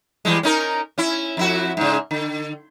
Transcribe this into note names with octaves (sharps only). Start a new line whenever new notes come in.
E3 G3 G#3
C#4 D#4 A#4
C#4 E4
F2 E4 F#4
G#2 C#3
D3